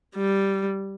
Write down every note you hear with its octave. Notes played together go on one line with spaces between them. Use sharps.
G3